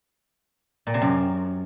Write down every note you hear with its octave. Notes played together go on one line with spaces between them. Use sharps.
A#2
C3
F#2